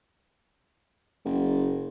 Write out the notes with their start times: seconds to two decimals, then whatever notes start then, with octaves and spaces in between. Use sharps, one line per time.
1.25 F#1